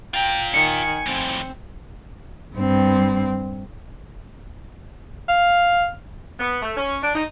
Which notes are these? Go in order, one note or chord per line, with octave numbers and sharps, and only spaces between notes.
F4 G5 A#5
D#3 G#5 C#7
F2 A2 C4
G2 C4
F5
B3
A3
C#4
D4
D#4